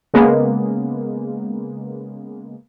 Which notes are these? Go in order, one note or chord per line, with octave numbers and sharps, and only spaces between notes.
C#3 G#3 A#3 B3